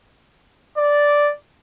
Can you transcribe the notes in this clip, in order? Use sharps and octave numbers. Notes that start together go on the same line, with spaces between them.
D5